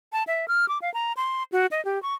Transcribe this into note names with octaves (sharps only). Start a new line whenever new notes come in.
A5
E5
F6
D6
F5
A#5
C6
F#4
D#5
G4
C#6